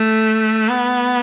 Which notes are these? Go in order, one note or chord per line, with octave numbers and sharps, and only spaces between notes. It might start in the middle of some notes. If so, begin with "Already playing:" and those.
Already playing: A3
B3